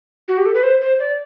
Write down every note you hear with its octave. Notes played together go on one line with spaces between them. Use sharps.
F#4
G4
A4
B4
C5
C5
D5